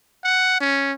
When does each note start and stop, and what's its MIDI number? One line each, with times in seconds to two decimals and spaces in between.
0.24 0.60 78
0.61 0.92 61